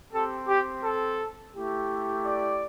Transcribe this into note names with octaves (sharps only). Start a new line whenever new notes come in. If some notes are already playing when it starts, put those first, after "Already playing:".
C4 G4 A4
G4
A4
A3 E4 G4
D5